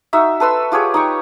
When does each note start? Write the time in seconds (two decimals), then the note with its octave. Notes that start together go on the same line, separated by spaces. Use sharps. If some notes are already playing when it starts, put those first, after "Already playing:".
0.13 D#4 F#4 E5
0.40 A4 B4 C6 E6
0.72 F4 G4 G#4 C#5
0.94 D#4 G5 C#6